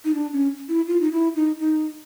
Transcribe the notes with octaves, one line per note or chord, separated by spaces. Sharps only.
D#4
D4
C#4
E4
F4
D#4
E4
D#4
D#4